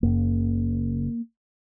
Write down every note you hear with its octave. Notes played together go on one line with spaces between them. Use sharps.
F#1 F#2 C#3 A#3